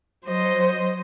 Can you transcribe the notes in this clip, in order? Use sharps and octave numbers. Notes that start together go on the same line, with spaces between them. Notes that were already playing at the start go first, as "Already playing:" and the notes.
F#3 C5 D#5